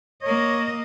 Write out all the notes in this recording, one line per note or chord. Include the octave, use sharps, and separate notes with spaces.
A#3 C#5 D#5